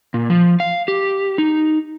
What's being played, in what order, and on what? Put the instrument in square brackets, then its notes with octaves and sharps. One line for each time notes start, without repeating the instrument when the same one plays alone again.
[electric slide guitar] A#2
F3
F5
G4
D#4